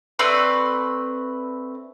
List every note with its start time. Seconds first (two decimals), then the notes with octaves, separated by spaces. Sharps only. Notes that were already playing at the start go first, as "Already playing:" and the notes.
0.19 A3 C4 B4 D5